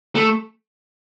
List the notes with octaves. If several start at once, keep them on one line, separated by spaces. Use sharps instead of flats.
A3